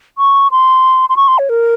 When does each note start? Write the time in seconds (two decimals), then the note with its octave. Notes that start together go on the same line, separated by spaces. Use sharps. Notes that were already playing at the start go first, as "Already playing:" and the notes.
0.18 C#6
0.51 C6
1.09 C6
1.17 C#6
1.28 C6
1.38 C#5
1.49 A#4